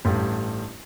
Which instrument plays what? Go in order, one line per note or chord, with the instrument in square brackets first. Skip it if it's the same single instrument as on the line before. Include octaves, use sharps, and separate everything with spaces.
[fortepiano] A1 G2